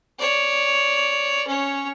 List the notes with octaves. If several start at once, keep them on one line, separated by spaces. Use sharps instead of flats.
C#5 D5
C#4 C#5